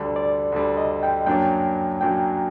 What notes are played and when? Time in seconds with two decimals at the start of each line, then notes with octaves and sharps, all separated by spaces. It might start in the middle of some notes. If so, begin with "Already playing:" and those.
Already playing: D2 D3 G3 D5
0.16 D5
0.52 D2 D3 G3
0.77 D#5
1.03 G5
1.26 F#2 F#3 A#3 D4 G5
2.01 F#2 F#3 A#3 D4 G5